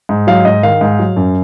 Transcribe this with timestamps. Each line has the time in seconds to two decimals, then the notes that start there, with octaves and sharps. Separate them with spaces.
0.09 G#2
0.27 F#3 F5
0.45 G#2 D#5
0.63 D#3 F5
0.81 G#2
0.99 F#3
1.16 F#2